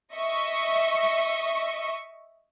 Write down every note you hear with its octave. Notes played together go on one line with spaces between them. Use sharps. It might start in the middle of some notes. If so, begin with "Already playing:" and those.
D#5 E5 C#6